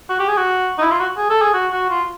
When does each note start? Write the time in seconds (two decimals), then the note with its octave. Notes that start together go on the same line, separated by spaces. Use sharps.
0.09 F#4
0.19 G4
0.28 G#4
0.37 F#4
0.78 D#4
0.82 E4
0.91 F4
1.00 F#4
1.17 G#4
1.30 A4
1.41 G#4
1.54 F#4
1.72 F#4
1.90 F4